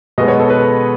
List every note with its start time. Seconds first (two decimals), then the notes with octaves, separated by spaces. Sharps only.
0.18 B2 G#3 B3 D#5
0.28 C#5
0.39 A4
0.50 B4